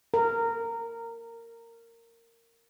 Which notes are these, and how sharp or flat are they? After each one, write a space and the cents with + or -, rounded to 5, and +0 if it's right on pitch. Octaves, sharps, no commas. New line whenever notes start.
A#4 -15